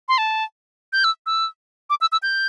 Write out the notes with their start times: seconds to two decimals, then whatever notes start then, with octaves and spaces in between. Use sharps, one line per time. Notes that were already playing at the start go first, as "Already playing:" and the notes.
0.08 C6
0.18 A5
0.93 G6
1.04 E6
1.26 E6
1.90 D6
2.01 E6
2.12 E6
2.23 G6